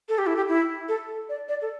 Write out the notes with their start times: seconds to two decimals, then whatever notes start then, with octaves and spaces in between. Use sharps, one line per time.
0.09 A4
0.18 G4
0.27 E4
0.36 G4
0.48 E4
0.89 A4
1.29 D5
1.48 D5
1.62 A4